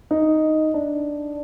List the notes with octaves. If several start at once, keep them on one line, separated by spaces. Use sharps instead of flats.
D#4
D4